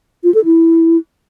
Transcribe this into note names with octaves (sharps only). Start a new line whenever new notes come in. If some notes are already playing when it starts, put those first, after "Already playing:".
F4
A4
E4